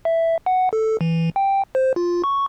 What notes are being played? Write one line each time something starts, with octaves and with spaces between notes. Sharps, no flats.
E5
F#5
A4
E3
G5
C5
F4
C#6